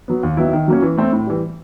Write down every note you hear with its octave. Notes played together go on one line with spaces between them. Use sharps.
F#3 B3
D#2
D#3 F#3 B3 E4
D#3
F#3 A#3 C#4
E3
A3 C4
A2
E3 G3